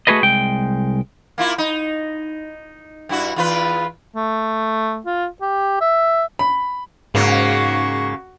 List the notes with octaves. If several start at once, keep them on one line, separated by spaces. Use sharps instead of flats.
A3 F#4 G#4 B4 D#5
C2 G#3 G5
A#3 E4 F4
D#4
G2 E4 F#4
E2 F4 B4
A3
F4
G4
E5
B5
G#2 C#3 A#3 F#4